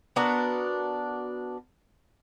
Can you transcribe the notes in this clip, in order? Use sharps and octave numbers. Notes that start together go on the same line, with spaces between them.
B3 D4 F#4 A#4